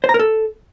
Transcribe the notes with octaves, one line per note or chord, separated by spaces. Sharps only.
C5
A#5
A#4
A4